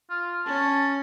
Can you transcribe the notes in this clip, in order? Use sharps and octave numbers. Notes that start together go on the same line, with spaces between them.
F4
C#4 A5